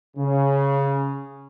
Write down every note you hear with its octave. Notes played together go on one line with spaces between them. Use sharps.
C#3